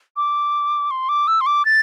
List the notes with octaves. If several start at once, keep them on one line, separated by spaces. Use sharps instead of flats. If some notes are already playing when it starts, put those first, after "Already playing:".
D6
C6
D6
E6
C6
D6
A6